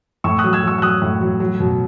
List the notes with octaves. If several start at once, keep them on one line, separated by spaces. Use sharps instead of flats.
A2 C#6 E6
D#6 F#6
F#3
E6 G#6
F#3 C#6 E6
E6
F#3 D#6 F#6
A2
F#3
F#3
B2